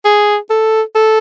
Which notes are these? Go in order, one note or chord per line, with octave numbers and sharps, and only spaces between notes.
G#4
A4
A4